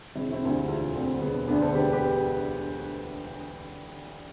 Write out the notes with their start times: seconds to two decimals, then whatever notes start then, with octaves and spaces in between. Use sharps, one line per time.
0.15 E1 C4 E4
0.32 C4 E4
0.42 D2 D3
0.51 E4 G4
0.68 E1 F4 A4
0.95 D2 D3 C4
1.22 E1 B3
1.48 D2 D3 B3 D4
1.61 A4 C5
1.75 E1 G4 B4
1.92 G4 B4